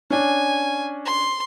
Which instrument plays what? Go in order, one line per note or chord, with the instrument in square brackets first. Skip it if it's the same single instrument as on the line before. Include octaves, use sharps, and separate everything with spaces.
[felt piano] C#4 D4 [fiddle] G#5
[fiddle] C6